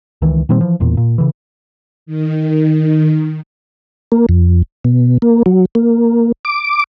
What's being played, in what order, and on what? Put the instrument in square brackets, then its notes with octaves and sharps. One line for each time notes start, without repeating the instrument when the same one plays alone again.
[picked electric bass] C#2 D#3 E3
A#2 D#3 G3 C4
E3 F3
E1 E2 A#2
A#2
C#3 E3
[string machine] D#3
[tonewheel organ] A#3
F2
B2
A#3
F#3
A#3
D6